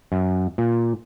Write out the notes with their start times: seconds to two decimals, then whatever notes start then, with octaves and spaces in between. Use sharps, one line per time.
0.12 F#2
0.58 A#2